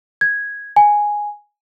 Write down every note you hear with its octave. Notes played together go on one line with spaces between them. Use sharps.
G#6
G#5